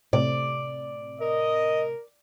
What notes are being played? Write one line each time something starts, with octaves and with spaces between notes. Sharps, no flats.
A2 C3 D5
A#4 D#5